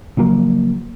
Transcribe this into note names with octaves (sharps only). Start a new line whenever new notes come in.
C#3 F3 F#3 A#3